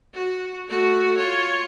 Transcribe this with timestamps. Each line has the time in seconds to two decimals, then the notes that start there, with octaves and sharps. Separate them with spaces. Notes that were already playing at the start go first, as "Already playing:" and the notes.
0.14 F#4
0.68 A3 F#4
1.17 F4 C#5